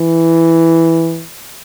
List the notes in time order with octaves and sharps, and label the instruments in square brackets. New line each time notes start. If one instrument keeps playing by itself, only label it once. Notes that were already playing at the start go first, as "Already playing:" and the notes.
Already playing: [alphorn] E3